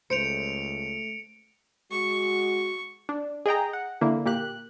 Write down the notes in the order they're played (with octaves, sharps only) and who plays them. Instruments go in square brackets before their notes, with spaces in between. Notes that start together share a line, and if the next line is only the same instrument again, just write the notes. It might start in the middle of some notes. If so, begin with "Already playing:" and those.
[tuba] C#2 [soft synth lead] A3 [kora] C5 [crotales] C#7 D7 F7
[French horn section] G#3 F#4 [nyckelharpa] C#6
[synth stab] D4
G#4 D#5 G5 A#5
F#5
D3 A#3 E4
A#2 A#3 G4 F#6